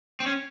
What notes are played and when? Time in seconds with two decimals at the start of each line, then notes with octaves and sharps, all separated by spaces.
0.20 C4
0.26 C#4